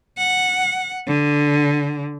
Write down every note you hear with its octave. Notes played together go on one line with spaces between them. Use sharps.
F#5
D3